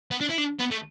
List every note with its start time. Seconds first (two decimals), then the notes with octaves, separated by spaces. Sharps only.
0.11 B3
0.21 D4
0.30 E4
0.38 D4
0.59 B3
0.71 A3